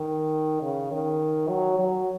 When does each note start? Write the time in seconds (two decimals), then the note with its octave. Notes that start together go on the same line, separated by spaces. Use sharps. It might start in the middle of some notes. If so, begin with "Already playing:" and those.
Already playing: D#3
0.62 C#3
0.91 D#3
1.49 F#3
1.79 F#3